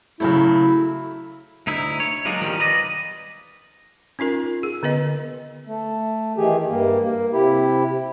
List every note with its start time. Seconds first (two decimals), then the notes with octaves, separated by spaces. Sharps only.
0.20 C#3 F#3 A3 E4
1.67 D2 D#4 E4
2.00 C#5
2.25 F#3 G#3 A#3 D4 D#4 G#4
2.41 E2 A#2 D#3 F3 G3 A#3
2.59 B4 D5 D#5
4.19 C#4 D#4 F4 A#4
4.63 G#4
4.83 D3 B3 B4 D#5
5.67 A3
6.37 D#3 E3 G4 G#4
6.68 G2 A#3
7.02 A#3
7.33 C3 E4 G4